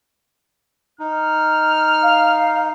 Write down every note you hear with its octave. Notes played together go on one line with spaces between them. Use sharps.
D#4 F6
F5